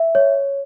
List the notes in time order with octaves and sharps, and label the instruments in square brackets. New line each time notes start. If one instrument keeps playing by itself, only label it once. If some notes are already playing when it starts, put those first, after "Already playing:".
Already playing: [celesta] E5
C#5